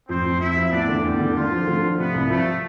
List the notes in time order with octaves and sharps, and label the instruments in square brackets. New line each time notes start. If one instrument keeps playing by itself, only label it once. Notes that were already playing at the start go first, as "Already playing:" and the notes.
[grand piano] F2 [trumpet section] C4 C5
[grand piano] F2
[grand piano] F2 [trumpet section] E4 E5
[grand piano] F3
[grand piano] E2 [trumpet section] D4 D5
[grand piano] D3
[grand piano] E2 [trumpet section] G3 G4
[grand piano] D3
[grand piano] D3 [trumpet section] F4
[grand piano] F3
D3
F3
[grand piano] C3 [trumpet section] B3
[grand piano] C2
[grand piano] F3 [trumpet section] A3